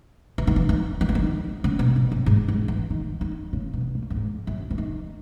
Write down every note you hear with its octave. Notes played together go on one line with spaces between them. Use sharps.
E3
D#3
E3
D#3
D#3
E3
D#3
C#3
B2
B2
F#2
G#2
G#2
E3
D#3
D#3
C#3
B2
A#2
F#2
G#2
F#2
E3
D#3